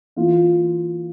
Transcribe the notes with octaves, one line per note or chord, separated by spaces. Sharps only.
E3 A#3 F4